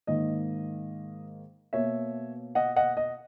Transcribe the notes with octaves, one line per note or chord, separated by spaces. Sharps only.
G#2 D#3 A#3 D#5
B2 A#3 C#5 E5
D#5 F#5
D#5 F#5
D#5